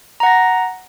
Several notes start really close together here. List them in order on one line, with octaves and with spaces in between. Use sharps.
A#5 F#5 A#6